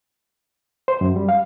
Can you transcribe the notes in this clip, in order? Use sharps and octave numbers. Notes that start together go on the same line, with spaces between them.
C5
F#2
G3
F5